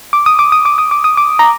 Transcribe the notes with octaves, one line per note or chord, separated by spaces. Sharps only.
D6
D#6
D6
D#6
D6
D#6
D6
D#6
D6
A#5